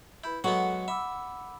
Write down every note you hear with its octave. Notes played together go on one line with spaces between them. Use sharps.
E4 B4 B5 G6
F#3 G#3 B3 A4 F#5
E5 B5 D6 E6